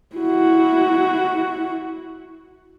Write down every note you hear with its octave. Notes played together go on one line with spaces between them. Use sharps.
E4 F#4